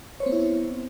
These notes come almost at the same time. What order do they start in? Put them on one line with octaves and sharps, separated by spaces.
C#5 C5 C4 B3 E4